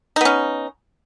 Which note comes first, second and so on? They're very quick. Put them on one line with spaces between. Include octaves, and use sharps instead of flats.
D#4 B3 C#4